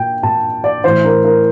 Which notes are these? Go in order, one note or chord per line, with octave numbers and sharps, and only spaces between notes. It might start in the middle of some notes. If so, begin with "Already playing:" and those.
Already playing: A#2 G5
A#2 A5
D5
A2 E3 C5
A#4
A#4